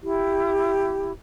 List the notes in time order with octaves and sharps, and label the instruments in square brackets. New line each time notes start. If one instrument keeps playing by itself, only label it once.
[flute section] E4 G4